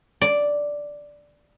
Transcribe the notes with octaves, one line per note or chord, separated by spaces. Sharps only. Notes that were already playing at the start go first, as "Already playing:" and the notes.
D5